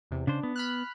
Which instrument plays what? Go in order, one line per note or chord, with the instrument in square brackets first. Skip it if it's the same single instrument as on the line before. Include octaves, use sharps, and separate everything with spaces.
[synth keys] E2 C3
[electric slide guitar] C#3 C5 [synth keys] D4
[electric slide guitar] B3
[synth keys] B5 F6 F#6